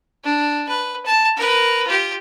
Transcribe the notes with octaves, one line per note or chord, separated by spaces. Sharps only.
D4
B4
A5
A#4 B4
F4 G4